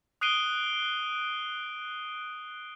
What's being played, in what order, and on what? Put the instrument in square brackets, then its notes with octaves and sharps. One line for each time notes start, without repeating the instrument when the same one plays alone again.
[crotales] D#6 F#6 C7 D7 D#7 G7